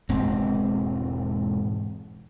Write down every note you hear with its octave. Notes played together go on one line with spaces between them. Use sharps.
E1 G#2 C4